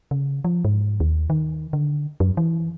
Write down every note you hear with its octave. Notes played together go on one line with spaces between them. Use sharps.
C#3
F3
G#2
D#2
D#3
D3
F#2
E3